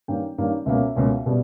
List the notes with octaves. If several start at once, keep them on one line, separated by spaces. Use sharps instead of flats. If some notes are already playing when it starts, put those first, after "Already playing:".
G2 D#3 A#3 C#4 G5
G2 D#3 A#3 C#4
C#2 B2 A#3 C#4 E5
C#2 B2 A#3 C#4
B2 G3